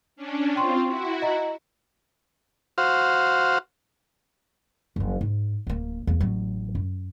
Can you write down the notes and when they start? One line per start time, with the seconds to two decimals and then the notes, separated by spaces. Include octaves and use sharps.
0.16 C#4 D4
0.56 C4 F4 G5 C6 C#6
0.87 E4 F#4
1.22 D#5 A#5
2.78 F#4 C5 F5
4.96 F#1 F3
5.21 G#2
5.67 D1 A#3
6.07 E2 A#3
6.20 A1 F#3
6.75 F#2